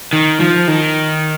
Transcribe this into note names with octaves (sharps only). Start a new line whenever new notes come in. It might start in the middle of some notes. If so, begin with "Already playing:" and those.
D#3
F3
D#3